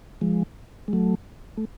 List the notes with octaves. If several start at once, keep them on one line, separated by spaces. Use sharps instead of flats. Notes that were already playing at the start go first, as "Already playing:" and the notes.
F3 G#3
G#3
F#3 A3
A3